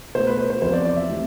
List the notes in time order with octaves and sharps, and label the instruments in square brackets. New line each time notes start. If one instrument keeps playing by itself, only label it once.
[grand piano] B2 A3 C5
B4
C5
C5
E2 C3 F3 C5
D5
D5
E5
C3 E3 A3